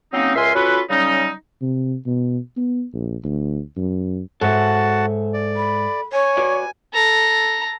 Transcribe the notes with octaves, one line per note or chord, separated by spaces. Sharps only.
F#3 A#3 C4 C#4 D#4
C#2 A#4 E5 G#5 C6
C#4 F4 F#4 A4 B4
C#3 F#3 G3 C#4 D#4
C3
B2
B3
A#1
D2
F#2
G#2 F#4 A4 C#5 E5 F#5 A5
D5
B5
C#5 G#5
F#4 B4 D5
A4 A#5